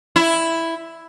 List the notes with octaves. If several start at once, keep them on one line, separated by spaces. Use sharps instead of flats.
E4